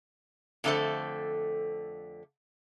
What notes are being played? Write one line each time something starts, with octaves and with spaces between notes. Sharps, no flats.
F2 D3 A3 B3 A4 C5